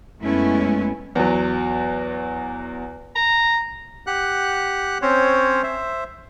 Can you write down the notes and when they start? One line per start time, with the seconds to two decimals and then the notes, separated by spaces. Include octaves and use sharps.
0.20 F#2 G#3 A3 B3 C#4 E4
1.15 E2 F#3
3.16 A#5
4.07 G4 F#5 F#6
5.02 C4 C#4 C5 C#5
5.63 C5 E5